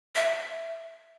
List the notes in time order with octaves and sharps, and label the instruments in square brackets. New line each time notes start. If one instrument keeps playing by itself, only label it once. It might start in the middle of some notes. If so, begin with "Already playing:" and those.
[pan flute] E5